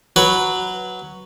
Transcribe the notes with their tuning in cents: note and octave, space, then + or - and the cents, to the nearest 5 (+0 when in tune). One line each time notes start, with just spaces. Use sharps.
F#3 +0 B4 +0